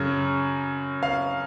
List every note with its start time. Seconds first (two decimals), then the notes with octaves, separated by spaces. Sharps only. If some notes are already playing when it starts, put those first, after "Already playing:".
Already playing: F#2 C#3
1.03 F5